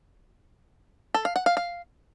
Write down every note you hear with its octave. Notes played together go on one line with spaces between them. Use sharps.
A4
F5
F#5
F5
F5